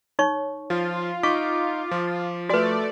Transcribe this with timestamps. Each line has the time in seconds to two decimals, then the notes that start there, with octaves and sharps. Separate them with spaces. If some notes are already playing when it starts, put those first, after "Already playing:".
0.19 D#4 C#5 C#6
0.70 F3 F4
1.23 D#4 C#6 D6 B6
1.91 F3
2.49 A3 F#4 B4 D5